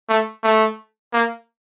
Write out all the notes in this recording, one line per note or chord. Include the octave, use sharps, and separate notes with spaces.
A3
A3
A#3